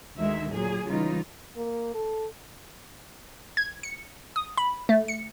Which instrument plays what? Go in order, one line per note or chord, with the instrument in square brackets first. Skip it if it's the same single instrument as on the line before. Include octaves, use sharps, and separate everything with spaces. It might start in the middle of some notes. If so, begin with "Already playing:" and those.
[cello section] D2 D#3 G#3 E5
A#2 F#3 G#4
C#3 E3 G3 G#3 D#4 F4
[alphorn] A#3
A4
[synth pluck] G#6
C#7
D#6
B5
A3
C#7